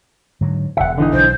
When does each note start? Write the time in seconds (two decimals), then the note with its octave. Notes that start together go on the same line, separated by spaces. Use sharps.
0.41 G#2 D3 F#3
0.77 E1 C#3 E5 F#5
0.98 D3 E3 D#4
1.13 B1 C5